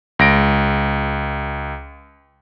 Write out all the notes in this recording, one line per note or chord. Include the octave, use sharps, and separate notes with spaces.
C#2 A#6 D7